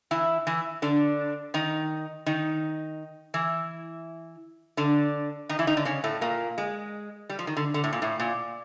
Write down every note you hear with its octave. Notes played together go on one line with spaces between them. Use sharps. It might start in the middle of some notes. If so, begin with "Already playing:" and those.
E3 E4
E3 E4
D3 D4
D#3 D#4
D#3 D#4
E3 E4
D3 D4
D#3 D#4
E3 E4
D#3 D#4
D3 D4
C#3 C#4
A2 A3
A#2 A#3
G#3
G3
F3
D#3
D3
D3
A2
A#2
A2
A#2